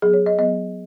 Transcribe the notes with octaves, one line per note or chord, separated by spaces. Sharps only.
F#3 B3 G#4
C#5
D#5
F#3 B3 D#5